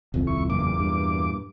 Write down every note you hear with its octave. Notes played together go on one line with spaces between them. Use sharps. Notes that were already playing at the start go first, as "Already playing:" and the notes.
D#1 C2 F2
E4 C#6
F#1 E2 A#2 D6
G2